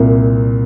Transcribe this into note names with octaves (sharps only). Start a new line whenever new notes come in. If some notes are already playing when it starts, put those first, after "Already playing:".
Already playing: C2 A#2